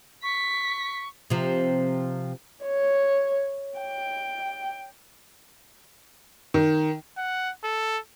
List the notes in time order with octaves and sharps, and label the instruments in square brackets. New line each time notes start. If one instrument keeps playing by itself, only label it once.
[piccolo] C#6 [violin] B6
[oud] C3 F3
[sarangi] C#5
G5
[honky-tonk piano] D#3
[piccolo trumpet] F#5
A4